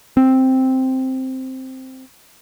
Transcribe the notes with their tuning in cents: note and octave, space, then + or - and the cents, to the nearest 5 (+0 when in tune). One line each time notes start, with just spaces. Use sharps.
C4 +0